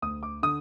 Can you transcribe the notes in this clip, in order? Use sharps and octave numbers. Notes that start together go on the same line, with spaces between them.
D2 D#6
D6
D3 D#6